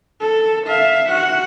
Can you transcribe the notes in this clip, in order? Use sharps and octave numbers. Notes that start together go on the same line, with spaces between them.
A4
E5 F5
F#4 F#5